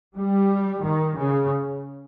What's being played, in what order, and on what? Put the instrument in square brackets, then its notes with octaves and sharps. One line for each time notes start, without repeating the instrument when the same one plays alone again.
[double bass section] G3
D#3
C#3